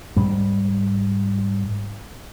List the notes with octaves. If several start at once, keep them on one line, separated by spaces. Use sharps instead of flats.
G#2 G3